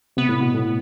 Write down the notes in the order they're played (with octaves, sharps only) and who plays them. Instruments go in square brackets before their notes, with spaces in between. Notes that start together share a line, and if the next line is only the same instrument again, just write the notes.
[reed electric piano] C3 [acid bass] B3
[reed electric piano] A2
B2
A2